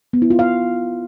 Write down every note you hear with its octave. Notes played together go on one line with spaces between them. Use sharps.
B3
E4
F4
F5